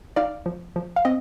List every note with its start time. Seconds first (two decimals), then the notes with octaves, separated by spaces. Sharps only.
0.16 D#4 D5 F5
0.46 F3
0.76 F3
0.96 F5
1.05 C4 D#5